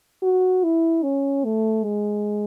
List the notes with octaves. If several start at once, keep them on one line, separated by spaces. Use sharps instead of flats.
F#4
E4
C#4
A3
G#3